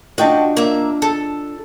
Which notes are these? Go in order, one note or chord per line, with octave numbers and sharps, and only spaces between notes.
D4 F4 F#4 D#5 G5 A5
A#3 E5
A4